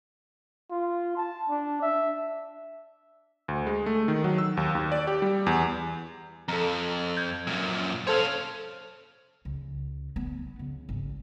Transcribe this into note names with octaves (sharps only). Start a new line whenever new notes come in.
F4
A5
D4
E5
D2
G#3
A3
D#3
F#3
E6
D#2
D#2
D5
G4
G3
E2
F2 A4 A#5
G6 G#6
F#2 A#2
A4 C5 C#5 F5
C#2
B3
C#2
G#1